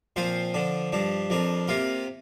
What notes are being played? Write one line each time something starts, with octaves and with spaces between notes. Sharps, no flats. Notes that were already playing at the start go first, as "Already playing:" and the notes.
A#2 F3 C4 F4 C5
D3 F3 D4
G2 F3 D4
F2 F3 D4 A#4
C3 A#3 F4 A#4